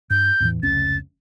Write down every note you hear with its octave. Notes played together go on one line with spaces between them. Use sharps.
G2 G6
E2 A2 E3
F1 C#2 C#4 A6